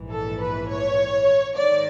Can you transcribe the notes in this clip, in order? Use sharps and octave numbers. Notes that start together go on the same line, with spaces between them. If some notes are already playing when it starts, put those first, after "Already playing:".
Already playing: A#1 G#2 E3
A4
B4
C#5
G#2 D#3 D5